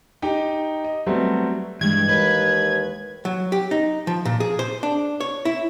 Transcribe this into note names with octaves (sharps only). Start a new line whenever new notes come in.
D#4 G4 D#5 G5
D#5
F#3 G3 A3 B3 C4
G2 E3 G#3 G#6
D#2 B4
F#3
G4
D#4
F3
A#2
G#4
C5
D4
C#5
E4